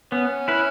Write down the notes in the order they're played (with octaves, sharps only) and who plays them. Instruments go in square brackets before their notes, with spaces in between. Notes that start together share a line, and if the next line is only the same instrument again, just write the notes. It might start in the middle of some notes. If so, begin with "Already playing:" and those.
[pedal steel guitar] B3 [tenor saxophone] C#4
[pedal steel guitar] E4 B4